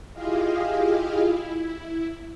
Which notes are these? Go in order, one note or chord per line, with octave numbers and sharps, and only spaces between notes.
E4 F4 G4 G#4 D#5 F5
E4